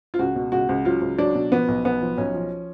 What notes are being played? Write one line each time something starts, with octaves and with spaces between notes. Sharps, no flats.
F4
C#2 F#4
B2
C#2 F#4
C#2
F#3 F4
C#2
F#3 D4
B2
F3 B3
B1
B1 B3
F3
B1 C#4
F3